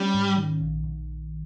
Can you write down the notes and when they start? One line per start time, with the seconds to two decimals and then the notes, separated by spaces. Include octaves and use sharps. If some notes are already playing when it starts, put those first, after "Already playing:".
Already playing: G3 C#4
0.14 G#2
0.37 D#3
0.60 A#1
0.84 A#1